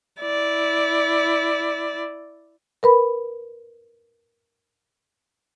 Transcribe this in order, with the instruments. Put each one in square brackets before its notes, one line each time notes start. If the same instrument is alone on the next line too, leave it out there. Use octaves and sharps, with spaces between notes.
[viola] E4 D5
[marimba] A#4 B4 B5